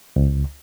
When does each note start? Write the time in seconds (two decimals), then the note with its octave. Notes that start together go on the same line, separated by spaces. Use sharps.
0.16 C#2